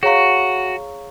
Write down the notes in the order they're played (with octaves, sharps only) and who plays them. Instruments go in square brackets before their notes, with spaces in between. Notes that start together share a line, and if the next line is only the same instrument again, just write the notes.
[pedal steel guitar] F#4 [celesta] G#4 C#5 F5 A#5 C#6